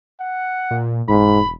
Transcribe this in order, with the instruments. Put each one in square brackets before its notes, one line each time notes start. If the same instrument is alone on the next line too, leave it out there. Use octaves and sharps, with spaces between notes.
[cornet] F#5
[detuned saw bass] A#2
[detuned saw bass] E1 [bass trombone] G#2 [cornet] B5